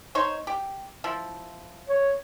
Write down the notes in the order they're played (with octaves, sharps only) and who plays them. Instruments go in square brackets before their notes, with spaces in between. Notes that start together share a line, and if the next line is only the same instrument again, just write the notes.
[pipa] D#4 C5 C#5
G4
F3 E4
[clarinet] C#5